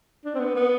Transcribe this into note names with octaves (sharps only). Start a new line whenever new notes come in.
D4
C4
B3
B3